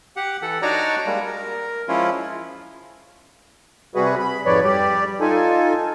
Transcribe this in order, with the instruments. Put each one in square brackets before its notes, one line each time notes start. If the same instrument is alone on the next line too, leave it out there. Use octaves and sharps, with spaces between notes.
[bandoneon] G4 F#5
E3 A4 F#5
D4 D#4 F#4 C#5 D5 A#5
G3 G#3 A#3
A#4
F3 G#3 C#4 E4 F4
[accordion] C3 G3 F#4 G#4 B4
B5
F2 G#2 F3 B4 C#5 D5
G3 G4 D5
D#4 F4 A4 G#5